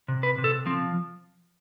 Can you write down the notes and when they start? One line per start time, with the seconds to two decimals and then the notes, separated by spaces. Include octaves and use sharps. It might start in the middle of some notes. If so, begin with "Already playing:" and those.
0.08 C3
0.23 B4
0.38 C3
0.44 A4
0.66 F3 C4